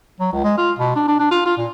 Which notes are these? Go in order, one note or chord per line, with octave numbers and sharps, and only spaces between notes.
F#3
C#2
G#3
F4
B2
D4
D4
D4
F4
F4
A#2